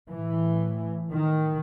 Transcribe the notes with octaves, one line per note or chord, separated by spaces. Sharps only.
A2 E3
D#3